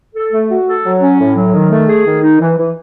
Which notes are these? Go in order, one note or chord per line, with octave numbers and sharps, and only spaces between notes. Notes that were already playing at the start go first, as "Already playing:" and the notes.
A4
A3
F#4
A4
F#3
C#4
A2
F#3
D#3
A3
G#4
D#3
D#4
E3
E3